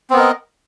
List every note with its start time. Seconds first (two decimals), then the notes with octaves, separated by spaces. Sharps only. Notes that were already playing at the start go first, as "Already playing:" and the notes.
0.10 C4
0.13 B3
0.17 A#4
0.20 D#5